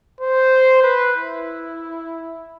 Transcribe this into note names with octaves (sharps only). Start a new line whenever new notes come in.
C5
B4
E4